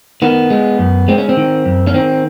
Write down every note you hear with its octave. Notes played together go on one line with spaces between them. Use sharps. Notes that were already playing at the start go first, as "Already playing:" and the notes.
D#3 B3
G#3
F#2
G#3 C4
C#4
C4
D#3
F#2
C#4
D#3 C4